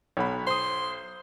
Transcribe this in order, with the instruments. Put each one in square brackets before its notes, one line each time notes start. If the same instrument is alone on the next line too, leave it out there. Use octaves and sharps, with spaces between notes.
[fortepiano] B1 [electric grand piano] C#5 F#5 B5
[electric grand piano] C5 D#6 [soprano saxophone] C6